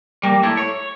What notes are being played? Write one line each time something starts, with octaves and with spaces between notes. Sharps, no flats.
G3 A#3
A3 E4
C#5